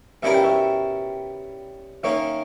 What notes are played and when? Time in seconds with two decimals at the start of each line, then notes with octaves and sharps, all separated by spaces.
0.23 B2 G3 C#4 E4 A#4 E5
0.34 G5
0.44 C#5 E5
2.03 D#3 A#3 C#4 C#5 E5